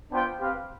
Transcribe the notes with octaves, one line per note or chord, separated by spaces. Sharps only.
B3 D4 F4 C5 G5
C4 G4 B4 F5